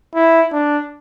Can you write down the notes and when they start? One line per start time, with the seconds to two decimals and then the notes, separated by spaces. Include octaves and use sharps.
0.15 E4
0.52 D4